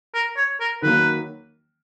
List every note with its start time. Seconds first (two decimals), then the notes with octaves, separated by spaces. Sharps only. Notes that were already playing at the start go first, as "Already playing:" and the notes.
0.14 A#4
0.37 C#5
0.60 A#4
0.82 D#3 F#3 A#3 B4